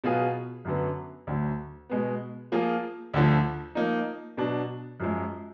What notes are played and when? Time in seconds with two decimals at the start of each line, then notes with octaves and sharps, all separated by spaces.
0.04 B2 F#3 B3 F4 G#4
0.65 F#2 D3 F#3 B3
1.27 D2 D3 F#3
1.89 B2 G#3 B3
2.52 F3 A#3 F4 G#4
3.14 D2 D3 F3
3.75 F3 A#3 D#4
4.37 B2 F#3 D4
5.00 F#2 F3 G#3